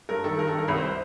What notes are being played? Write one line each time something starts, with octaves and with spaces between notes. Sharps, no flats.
G2 A#4
D#3 A4
G2 A#4
A4
D#3
A#4
C2 B4
C5
C5